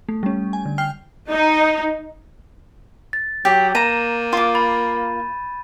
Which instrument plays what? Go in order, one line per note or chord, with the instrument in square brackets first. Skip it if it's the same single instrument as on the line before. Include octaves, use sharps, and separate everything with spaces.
[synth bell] A3
G3 C#4
G#5
D3
G5 F6 C7
[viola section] D#4
[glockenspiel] A6
[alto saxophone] F#3 [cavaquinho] G4 [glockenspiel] G6
[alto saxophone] A#3 [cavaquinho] A#5 [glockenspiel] D#7 E7
[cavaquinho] F4 D6
[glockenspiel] B5 A6